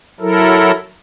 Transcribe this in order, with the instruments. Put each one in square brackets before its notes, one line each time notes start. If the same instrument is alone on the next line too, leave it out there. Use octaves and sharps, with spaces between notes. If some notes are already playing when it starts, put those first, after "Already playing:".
[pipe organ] F#3 E4 A4 A#4